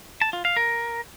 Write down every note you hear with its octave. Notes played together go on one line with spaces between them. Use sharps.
A5
F4
F5
A#4